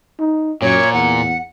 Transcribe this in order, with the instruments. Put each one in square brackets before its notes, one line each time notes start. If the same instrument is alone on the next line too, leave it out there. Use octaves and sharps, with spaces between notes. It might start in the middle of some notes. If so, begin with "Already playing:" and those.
[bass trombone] D#4
[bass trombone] F#2 [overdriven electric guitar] A#2 [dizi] C#5
[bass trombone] E2 [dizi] F#5